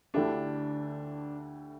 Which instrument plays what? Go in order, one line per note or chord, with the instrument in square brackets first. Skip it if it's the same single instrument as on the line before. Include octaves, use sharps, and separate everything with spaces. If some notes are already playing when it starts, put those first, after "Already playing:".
[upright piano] D2 D3 A3 E4 G4 [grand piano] D4